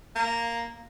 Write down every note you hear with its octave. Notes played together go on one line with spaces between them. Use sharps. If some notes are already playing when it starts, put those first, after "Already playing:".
A#3